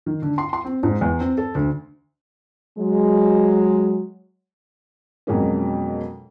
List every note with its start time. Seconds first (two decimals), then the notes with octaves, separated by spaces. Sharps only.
0.06 D#3
0.22 D3
0.38 C6
0.53 C6
0.65 C4
0.83 G#2
1.01 E2
1.20 C4
1.38 A4
1.55 D2
2.78 F#3 G#3
5.27 F2 B2 F#3 G#3 A#3 C#4